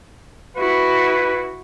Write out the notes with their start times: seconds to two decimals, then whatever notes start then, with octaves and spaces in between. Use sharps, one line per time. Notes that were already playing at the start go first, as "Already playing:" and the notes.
0.57 E4 F#4 B4